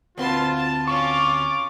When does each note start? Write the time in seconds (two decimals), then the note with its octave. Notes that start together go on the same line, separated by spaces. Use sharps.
0.18 D2 C4 F4 B4 A5 C6
0.57 A5
0.88 C#4 F4 C#6 D6